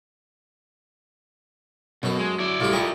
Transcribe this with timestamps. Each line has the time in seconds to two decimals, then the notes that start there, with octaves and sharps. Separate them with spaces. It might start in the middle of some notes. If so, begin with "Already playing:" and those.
2.03 F#2 B2 A4
2.19 G#3
2.39 E4 D5
2.60 F#2 A2 G3 F4 G4
2.73 F#2 G3 A4 A#4 D#5